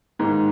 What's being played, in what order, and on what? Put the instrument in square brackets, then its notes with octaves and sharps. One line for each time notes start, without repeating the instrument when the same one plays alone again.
[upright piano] G#2 D#3 A#3 D#4